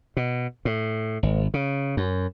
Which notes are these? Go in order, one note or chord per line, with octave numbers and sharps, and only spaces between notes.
B2
A2
G#1
C#3
F#2